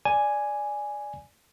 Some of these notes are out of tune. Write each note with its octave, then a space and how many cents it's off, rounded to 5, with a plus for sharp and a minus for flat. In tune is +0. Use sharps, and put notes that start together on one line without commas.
D5 +0 G#5 +0